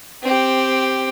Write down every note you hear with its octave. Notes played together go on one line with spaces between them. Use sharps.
C4 G4